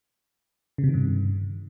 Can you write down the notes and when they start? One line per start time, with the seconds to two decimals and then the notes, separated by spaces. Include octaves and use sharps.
0.78 C#3
0.84 C3
0.89 D#3
0.94 G2